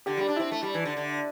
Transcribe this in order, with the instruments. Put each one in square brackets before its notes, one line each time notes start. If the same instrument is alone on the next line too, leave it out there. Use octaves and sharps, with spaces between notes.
[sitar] D3 [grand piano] G4
[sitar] G3 [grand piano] G4
[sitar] D4
[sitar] C4 [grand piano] E4
[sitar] A3
G3
E3
D3
D3